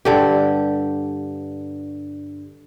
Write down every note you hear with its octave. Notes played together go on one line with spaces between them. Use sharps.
G2 D3 G4